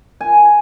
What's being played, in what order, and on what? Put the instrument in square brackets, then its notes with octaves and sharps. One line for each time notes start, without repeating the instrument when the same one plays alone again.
[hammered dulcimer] G#5